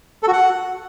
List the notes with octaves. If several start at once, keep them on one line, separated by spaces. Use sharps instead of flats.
A4
F#4
F#5